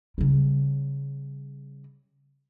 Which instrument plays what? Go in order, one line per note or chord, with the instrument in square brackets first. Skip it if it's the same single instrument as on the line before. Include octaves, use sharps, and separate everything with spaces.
[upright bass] C#3 G3